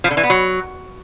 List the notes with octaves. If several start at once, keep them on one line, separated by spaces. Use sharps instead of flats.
F3
D3
E3
B3
F#3